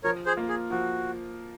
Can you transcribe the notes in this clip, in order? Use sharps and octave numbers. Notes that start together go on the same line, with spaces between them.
F3 A#4 C#5
G#4 C5
A#3 F4
G#4
F3 F#4